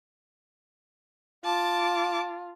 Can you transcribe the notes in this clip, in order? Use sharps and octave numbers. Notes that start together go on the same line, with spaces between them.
F4 A5 D6